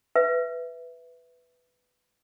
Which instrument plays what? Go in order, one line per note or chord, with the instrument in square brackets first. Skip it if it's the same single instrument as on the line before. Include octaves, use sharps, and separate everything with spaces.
[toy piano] B4 E5